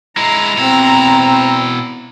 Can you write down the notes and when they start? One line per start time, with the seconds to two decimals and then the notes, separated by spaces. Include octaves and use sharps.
0.17 G#3 E4 A#5
0.57 B2 C4 E4